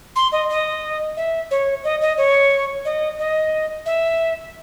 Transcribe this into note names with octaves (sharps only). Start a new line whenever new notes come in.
C6
D#5
D#5
E5
C#5
D#5
D#5
C#5
D#5
D#5
E5